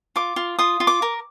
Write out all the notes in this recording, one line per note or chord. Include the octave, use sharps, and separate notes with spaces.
F4 D6
F4
F4 D#6
F4
D6
A#4